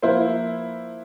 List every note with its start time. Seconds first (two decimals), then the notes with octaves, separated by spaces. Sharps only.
0.02 F3 A#3 E4 B4 C5